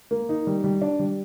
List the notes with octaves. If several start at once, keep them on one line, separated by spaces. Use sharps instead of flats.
A#3
D#4
G3
G3
D4
G3